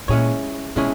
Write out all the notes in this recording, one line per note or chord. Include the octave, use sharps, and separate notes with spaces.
A#2 G#3 C#4 E4 G#4 C#5
B2 G#3 C#4 E4 G#4